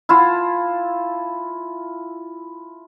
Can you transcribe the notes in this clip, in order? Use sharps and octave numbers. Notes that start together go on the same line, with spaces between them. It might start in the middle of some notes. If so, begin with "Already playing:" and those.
E4 F4 A5